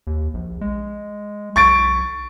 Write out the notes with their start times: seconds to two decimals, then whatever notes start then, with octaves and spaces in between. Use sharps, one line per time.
0.07 D#2
0.34 A#1
0.61 G#3
1.56 B1 C#6 A6 D7